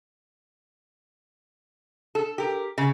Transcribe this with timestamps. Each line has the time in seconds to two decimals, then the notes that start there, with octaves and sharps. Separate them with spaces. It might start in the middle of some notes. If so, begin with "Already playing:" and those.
2.15 A4
2.38 G4 A#4
2.78 C#3